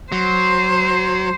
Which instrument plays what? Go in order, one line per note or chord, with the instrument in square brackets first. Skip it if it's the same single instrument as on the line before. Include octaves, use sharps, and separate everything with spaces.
[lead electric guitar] F#3 [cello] C5